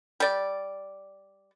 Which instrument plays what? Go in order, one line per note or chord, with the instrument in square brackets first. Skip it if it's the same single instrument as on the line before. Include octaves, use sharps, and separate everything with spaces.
[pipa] G3 D5